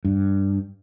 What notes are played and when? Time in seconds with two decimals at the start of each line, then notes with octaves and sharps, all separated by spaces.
0.05 G2